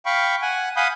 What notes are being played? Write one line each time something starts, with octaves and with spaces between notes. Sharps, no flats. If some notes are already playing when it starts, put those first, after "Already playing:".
F5 G5 B5 C#6
F#5 G#5
F5 F#5 G#5 B5 D#6 G6